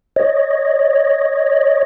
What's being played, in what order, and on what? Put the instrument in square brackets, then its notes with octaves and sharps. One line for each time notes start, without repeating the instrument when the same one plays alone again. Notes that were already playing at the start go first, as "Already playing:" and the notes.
[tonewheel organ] C#5 D#5